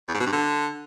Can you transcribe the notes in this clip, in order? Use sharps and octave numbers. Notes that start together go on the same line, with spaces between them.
E2
G#2
B2
G2
D3